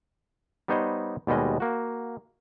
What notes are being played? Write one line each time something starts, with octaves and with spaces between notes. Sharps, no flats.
G3 B3 D#4 C5 C#5 D#5
D#2 B2 G3 G#3 D#5
A#3 F#4